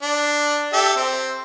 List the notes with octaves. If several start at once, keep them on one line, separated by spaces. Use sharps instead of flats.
D4
G4 A4 E5
C4